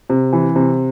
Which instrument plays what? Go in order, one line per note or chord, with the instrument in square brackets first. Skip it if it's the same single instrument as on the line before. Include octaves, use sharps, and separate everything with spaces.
[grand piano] C3
E3
C3